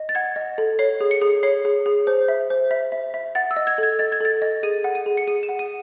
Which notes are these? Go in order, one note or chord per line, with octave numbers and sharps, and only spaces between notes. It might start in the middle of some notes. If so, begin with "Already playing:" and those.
Already playing: D#5
A6
F#5 G#6
D#5
A4
C#5 C7
G#4
C#7
G#4
C#5 C7
G#4
G#4
C5
E5
C5
E5
E5
E5
F#5 A6
E6
D#5
G#6
A4 G#6
D#5 A6
G#6
A4 A6
D#5
G#4 D#7
F#5
D#7
G#4
C#7
G#4 D#7
E7
F#5
D#7